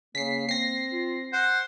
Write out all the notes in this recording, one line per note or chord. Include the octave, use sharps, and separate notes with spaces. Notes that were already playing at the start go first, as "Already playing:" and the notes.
C#3 A#3 B6 C7
C4 A#6 C7
F4
C5 F#5